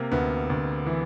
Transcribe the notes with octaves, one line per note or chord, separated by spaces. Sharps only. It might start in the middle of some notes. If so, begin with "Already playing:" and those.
Already playing: C3 A#3
D2 B3
D2
E3